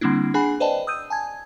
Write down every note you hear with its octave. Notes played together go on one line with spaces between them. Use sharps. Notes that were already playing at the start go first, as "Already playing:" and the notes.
D3 G3 A#3 C4 D4 E4
D4 G#4 F#5 G#5 B5
B4 C5 D5 D#5 G5 A5
D#6 E6 G6 D#7
G#5 A5 G#6